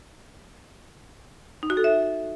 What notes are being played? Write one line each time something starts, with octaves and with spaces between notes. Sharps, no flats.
D#4
F#4
A4
E5